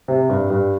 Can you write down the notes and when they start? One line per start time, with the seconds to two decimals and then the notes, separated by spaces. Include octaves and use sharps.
0.08 C3
0.29 G2
0.50 G2